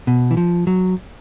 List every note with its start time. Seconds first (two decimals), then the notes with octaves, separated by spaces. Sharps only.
0.07 B2
0.31 E3
0.37 F3
0.67 F#3